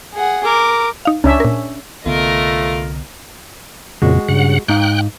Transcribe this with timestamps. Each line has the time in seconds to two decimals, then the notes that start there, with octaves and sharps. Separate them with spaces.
0.14 G#4 F#5
0.45 A#4 D6
1.05 D#4 F5
1.24 C#2 C#4 D4 E5
1.40 A#2 A#4
2.06 C2 D3 A3 B3 F4 A#4 D#5
4.02 F2 A#2 C#3 G#3 F#4
4.28 G2 C#3 F#5
4.68 G#2 D#4 F5 G5 F#6